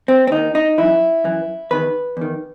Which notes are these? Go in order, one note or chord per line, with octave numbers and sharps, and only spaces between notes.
C4
C4
D#2 D#3 D#4
D#4
F#2 E3 E4
F#2 E3
E2 D#3 B4
E2 D#3